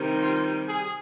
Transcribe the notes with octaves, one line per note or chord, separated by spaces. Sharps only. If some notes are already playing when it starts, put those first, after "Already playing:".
Already playing: C3 D#3 G3
F4
G#4